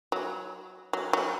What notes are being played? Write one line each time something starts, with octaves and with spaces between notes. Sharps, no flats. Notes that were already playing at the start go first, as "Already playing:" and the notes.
F#3
F#3
F#3